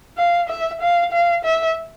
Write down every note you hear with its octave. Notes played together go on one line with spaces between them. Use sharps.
F5
E5
F5
F5
E5